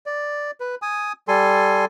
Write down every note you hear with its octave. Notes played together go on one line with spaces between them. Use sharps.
D5
B4
G#5 D#6
G3 A4 G#5 C6